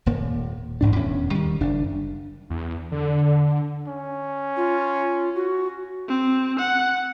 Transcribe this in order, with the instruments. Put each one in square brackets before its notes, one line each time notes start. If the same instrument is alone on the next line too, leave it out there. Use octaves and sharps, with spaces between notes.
[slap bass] D#1 A#2 A#3
A1 G#2 D4
D#1 E2 C#4
D#3 G3
F#1 D4
[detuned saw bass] E2
D3
[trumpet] C#4
[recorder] F4
F#4
[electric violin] C4
F#5